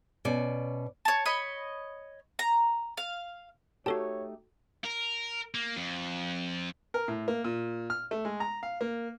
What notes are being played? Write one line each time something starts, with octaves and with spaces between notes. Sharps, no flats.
B2 C#4 D5
C#5 A5
C#5 D#5 B5
A#5
F5
A3 D#4 F#4 G4 A4 C#5 A5
A#4
A#3
F2
A#4
A2
A#3
A#2
F6
A3
G#3
A#5
F5
A#3